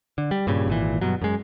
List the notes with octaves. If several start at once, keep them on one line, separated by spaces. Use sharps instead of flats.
D3
G3
G2 A#2 C#3
G#1 A#2 E3
G2 B2 F#3
F#2 G#3